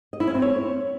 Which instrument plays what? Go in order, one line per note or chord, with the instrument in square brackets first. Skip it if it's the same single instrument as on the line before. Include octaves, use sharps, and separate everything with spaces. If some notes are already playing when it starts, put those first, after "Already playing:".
[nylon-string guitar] D#5
E4
C#4
C4
C#5